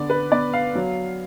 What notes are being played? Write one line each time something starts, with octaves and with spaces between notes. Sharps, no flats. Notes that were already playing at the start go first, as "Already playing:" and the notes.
Already playing: D3 B3 D5
B4
B3 D5
F5
F#3